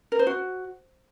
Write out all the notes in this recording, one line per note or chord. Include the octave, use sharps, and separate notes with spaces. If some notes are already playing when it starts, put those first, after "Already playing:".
A#4
C5
F#4